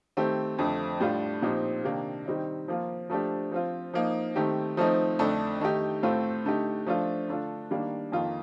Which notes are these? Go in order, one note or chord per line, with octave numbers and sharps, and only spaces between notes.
D#3 A3 C4 G4
F2 D3 F3 A3
A2 G3 D4 F4
A#2 F3 C4 D#4 G4
C3 D#3 A#3 D4
D#3 G3 C4 D#4
F3 A#3 F4
F3 A3 D4 G4
F3 C4 F4
F3 A#3 D#4
D#3 A3 C4 G4
F3 A3 C4 D#4
F2 D3 A3 D4
D#3 A3 D#4 G4
A2 A3 C4 F4
D3 A3 D#4 G4
F3 A3 D4 F4
D3 A3 D4 F4
D#3 G3 A#3 D4
F2 D#3 A#3 F4